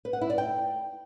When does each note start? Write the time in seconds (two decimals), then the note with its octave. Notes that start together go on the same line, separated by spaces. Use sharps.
0.05 B4
0.13 F#5
0.21 E4
0.30 D5
0.38 G5